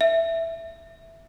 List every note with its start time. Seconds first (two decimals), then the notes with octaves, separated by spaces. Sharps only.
0.01 E5